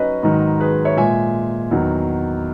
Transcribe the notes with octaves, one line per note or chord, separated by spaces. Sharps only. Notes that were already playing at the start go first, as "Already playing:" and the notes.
Already playing: F#3 C#4 D#4 B4 D#5
G#2 D#3 F#3
G#4 B4
C#5 E5
A#2 G#3 E5 G#5
E2 D#3 F#3